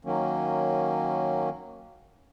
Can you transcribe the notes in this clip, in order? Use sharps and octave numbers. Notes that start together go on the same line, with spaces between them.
D#3 F#3 A#3 C#4